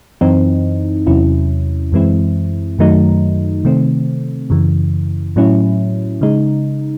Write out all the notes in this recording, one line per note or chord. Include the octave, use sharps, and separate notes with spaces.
F#2 E3 C4 D#4
E2 C3 F#3 C#4 E4
F#2 E3 G#3 C4 E4
F#2 D#3 F#3 A3 D#4
C3 D#3 A3 C4
F#2 C#3 E3
A2 F#3 C#4 E4
C#3 G#3 D#4